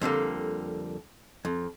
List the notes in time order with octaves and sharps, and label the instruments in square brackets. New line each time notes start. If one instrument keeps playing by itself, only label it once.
[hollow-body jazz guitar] F2 D3 G3 A#3
F2